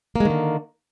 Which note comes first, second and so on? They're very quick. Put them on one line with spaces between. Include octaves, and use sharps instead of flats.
A#3 G#3 D#3 D3